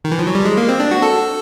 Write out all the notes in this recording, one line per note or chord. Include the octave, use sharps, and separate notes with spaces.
D#3
E3
F3
F#3
G3
G#3
A#3
C4
D4
F#4
A4